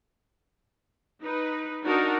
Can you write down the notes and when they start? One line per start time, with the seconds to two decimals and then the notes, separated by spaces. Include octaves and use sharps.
1.23 D#4 B4
1.86 D4 D#4 F#4 A#4